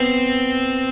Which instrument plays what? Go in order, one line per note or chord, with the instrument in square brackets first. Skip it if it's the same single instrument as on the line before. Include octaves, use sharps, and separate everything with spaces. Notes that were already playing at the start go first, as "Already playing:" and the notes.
Already playing: [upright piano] B3 [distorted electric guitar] C4